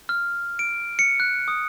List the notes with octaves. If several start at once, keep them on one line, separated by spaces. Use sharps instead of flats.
F6
D7
C#7
F#6
D#6